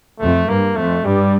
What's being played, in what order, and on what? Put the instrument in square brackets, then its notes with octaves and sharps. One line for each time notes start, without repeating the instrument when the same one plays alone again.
[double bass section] F2 [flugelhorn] A3
[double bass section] G2 [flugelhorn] A#3
[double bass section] F2 [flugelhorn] A3
[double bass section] G2 [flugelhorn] G3